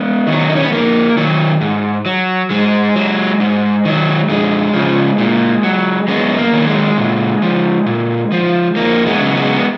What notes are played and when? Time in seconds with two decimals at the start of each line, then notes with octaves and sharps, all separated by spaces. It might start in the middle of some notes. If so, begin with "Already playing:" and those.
Already playing: G#3 B3
0.27 D#3 F#3
0.49 D#4
0.56 C#4
0.64 B3
0.72 F2 A#3
1.17 D#3 F#3
1.61 G#2
2.06 F#3
2.50 G#2 G#3
2.96 F#3
3.40 G#2
3.85 D#3 F#3
4.29 F2 G#3
4.74 C#3 F3
5.18 A#2
5.63 F#3
6.08 F#2 G#3 B3
6.38 A#3
6.52 D#3 F#3
6.67 G#3
6.97 A#2
7.42 F3
7.86 A#2
8.32 F3
8.76 F2 A#3
9.06 G#3 B3
9.21 C#3 F#3
9.36 G#3 B3